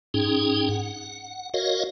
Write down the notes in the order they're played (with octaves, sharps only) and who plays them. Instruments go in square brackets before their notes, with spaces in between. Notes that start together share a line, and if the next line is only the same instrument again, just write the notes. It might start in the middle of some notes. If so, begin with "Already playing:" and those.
[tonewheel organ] G#2 C#4 D#4 G#4 G5
F#5
F#4 A#4 C#5 D#5 F5